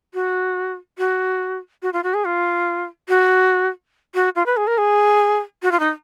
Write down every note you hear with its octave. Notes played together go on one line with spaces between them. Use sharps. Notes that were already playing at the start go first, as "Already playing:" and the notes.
F#4
F#4
F#4
F4
F#4
G#4
F4
F#4
F#4
F4
B4
G#4
A#4
G#4
F#4
F4
D#4